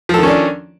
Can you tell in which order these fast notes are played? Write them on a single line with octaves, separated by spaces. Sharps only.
F3 A4 D#3 C#4 D4